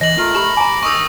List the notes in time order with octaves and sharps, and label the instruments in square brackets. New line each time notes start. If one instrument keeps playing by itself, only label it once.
[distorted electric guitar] E3 [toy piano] D#5 [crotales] A#6 F#7
[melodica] A3 A#4 [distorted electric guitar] F4
[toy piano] G4 [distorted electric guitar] A5 B5
[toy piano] G#5 A#5 [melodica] D6
[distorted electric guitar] A#4 D#5 [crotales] C#6 D#6 E6